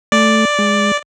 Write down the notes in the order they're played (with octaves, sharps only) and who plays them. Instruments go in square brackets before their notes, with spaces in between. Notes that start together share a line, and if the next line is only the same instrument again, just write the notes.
[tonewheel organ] A3 [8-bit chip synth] D5
[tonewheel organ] G#3